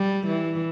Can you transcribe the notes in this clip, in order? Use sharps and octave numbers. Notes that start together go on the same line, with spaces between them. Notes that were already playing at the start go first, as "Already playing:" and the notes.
Already playing: G3
E3